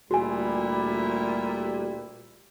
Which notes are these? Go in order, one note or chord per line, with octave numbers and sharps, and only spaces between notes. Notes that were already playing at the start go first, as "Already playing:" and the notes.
D2 A#2 G3 E4 F#4 G#5